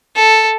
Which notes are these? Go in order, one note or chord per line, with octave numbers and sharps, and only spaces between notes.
A4